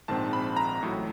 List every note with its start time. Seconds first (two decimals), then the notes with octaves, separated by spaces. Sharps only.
0.08 A#1 G#2 D#3 G#3 C4 A5
0.33 B5
0.57 A#5
0.81 A1 A2 F#3